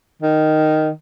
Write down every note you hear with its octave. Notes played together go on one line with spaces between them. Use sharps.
D#3